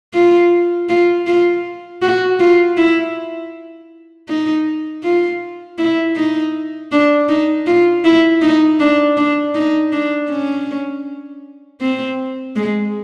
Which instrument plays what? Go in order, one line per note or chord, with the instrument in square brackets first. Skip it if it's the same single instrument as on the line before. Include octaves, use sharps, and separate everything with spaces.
[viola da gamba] F4
F4
F4
F#4
F4
E4
D#4
F4
E4
D#4
D4
D#4
F4
E4
D#4
D4
D4
D#4
D4
C#4
C4
G#3